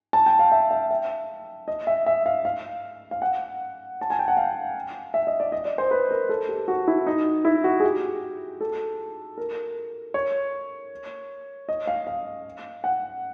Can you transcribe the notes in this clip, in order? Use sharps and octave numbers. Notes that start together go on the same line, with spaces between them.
A5
G5
F5
E5
E5
E5
D#5
E5
E5
F5
F5
F5
F#5
A5
G#5
G5
F#5
F5
E5
D#5
D5
D#5
D5
C5
B4
A#4
A4
G4
F#4
E4
D#4
E4
F#4
G#4
G4
A4
A#4
C#5
D#5
F5
F5
F#5